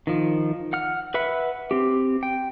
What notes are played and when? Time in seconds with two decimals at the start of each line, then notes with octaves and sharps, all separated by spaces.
0.07 D#3 F3
0.73 F#5 F6
1.14 B4 E5 F#5 B5
1.71 C4 G4
2.23 G5